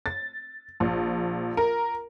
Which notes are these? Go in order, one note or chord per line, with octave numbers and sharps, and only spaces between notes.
A6
A#1
A#4